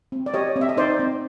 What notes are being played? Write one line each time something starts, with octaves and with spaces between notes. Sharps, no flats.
C4
D5
G4 C#5 D#5
C4
E5
D#5
D#4 C5 D5
C4